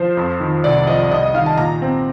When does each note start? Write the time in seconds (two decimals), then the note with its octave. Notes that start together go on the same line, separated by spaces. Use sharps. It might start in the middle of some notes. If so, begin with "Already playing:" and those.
Already playing: F3 C5
0.17 F2
0.40 D#3
0.64 C2 D5
0.87 F3 D#5
1.11 C2 D#5
1.23 D#5
1.34 D#3 F5
1.46 A5
1.58 A#2 A#5
1.82 C4